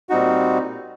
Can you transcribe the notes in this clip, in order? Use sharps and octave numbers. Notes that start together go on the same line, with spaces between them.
A#2 G3 C4 D#4 F#4